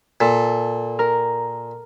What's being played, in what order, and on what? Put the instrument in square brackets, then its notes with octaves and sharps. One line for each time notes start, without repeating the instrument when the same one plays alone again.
[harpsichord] A#2 [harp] A4
[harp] A#4